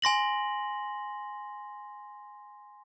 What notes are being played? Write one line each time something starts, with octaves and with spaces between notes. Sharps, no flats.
G#5 C6 A#6 F#7